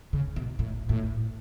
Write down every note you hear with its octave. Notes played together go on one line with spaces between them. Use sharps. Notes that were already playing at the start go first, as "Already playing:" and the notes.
C#3
B2
A2
A2